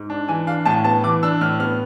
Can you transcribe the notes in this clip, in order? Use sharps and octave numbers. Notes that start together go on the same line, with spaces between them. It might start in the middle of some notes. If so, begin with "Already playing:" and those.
Already playing: G#2
D4
E3 G#5
D4 F5
A2 A5
B3 A5
E3 D6
D4 E6
A2 F6
B3 F6